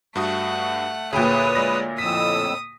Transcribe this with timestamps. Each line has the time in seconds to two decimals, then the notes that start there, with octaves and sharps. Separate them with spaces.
0.16 G2 A3 F#4 F#5 D#6
1.13 D2 A#2 G#4 B4 C#5 G5 D#6
1.55 G#3 D5 A#6
1.98 F2 A2 D#6 E6 B6